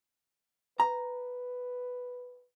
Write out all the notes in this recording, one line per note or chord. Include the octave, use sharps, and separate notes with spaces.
B4 A#5